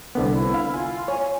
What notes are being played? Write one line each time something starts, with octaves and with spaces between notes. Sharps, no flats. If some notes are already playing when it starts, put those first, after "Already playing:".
C2 D3 B3
E4
F5
F4 G#5
C#5 G#5